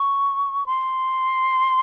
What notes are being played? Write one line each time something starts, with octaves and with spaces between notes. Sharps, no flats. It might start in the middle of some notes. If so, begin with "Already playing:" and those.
Already playing: C#6
C6